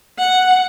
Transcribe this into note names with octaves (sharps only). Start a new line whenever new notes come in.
F#5